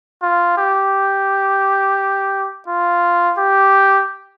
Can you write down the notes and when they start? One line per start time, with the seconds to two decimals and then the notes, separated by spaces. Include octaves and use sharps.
0.22 F4
0.57 G4
2.68 F4
3.38 G4